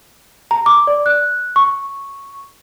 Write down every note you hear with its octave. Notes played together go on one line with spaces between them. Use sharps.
A#5
D6
D5
F#6
C#6